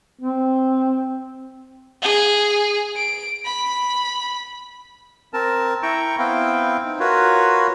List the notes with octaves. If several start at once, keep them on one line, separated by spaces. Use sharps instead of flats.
C4
G#4
D7
B5
C4 A#4 A5
E4 G5 A#5 C#6
B3 C4 E4 F5 G5
C4 D#4
F4 F#4 A#4 B4 C#5